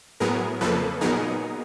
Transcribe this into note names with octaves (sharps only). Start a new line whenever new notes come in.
A2 F#3 B3 G#4 A#4
F2 C#3 F3 A#3 A4 B4
A#2 F#3 B3 D#4 G#4 A#4